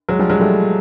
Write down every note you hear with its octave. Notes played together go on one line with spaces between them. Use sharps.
F#3 G#3
F3 G3
F#3 G#3
G3 A3